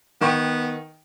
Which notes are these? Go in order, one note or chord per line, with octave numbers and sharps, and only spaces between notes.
D#3 B3 G5 C#6